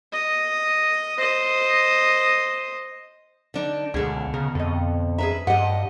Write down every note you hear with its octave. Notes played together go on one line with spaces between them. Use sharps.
D#5
C5 D#5
D3 D4 D#4
C#2 B2 D3 C#4 G#4
C#3 A#4
F2 A4 D#5
E2 G#4 B4 E5 A#5
G2 G4 D#5 F#5